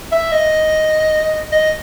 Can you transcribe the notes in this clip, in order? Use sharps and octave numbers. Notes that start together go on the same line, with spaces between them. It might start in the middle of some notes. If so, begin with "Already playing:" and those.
E5
D#5
D#5